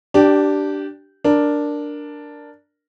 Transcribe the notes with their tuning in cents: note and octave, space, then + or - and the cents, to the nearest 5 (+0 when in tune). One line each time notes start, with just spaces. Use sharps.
D4 +0 G4 -15 G5 +15
D4 +0 A#4 +0